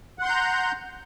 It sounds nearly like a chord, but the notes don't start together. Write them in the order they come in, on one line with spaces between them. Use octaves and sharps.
F#5 C6 G6 A#5